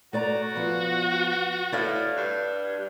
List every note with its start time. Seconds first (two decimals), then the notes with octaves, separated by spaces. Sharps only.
0.13 A3 F#4 D5 A#5
0.55 F3 B3
1.72 A2 D5 E5 F5
2.17 G2